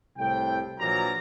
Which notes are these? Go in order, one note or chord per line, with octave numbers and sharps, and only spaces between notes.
C2 A2 C3 G5
A#1 E3 F#3 A#3 D5 A#5